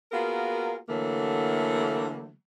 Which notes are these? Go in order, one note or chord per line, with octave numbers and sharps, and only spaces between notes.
A#3 B3 F4 F#4 G#4 A#4
D3 E3 F#3 A3 A#3